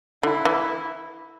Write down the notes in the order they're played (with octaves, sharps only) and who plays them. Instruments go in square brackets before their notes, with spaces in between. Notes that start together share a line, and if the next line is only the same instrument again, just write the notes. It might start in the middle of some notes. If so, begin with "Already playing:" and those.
[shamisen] D3 [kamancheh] E4
[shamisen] E3